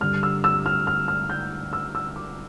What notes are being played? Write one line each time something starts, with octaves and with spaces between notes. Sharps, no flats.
G2 D3 G3 F6
E6
E6
F6
F6
F6
G6
E6
E6
D6